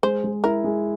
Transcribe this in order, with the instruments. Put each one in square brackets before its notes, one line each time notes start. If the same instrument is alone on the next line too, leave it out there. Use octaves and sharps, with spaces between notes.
[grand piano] G#3 [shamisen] C5
[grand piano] G#3
[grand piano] E4 [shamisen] A#4
[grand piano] G#3